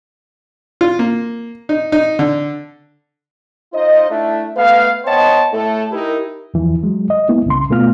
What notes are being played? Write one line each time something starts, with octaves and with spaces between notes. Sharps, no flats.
F4
A#3
D#4
D#4
D3
D#4 F4 C5 D#5
A3 D4 E4 E5
A3 B3 B4 F5
B3 C5 C#5 D#5 G5 A5
A2 A3 A4
D#4 E4 G4 A#4
E2 E3 F3
F#3 G#3
D#5
G#3 A#3 B3 E4
C2 C#3 C6
B2 A3 B3 F4 F6